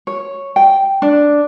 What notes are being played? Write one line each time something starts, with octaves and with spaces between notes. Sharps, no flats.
C#5
G5
D4